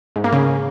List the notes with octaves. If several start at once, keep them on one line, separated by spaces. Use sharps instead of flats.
G#2
A#3
C#3